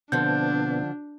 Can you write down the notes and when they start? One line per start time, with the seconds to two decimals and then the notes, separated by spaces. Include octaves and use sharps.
0.12 B2 D3 F3 B3 C4 D4 G6